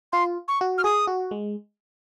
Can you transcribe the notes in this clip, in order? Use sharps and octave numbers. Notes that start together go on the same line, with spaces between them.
F4 C6
C#6
F#4
F6
G#4 D#6
F#4
G#3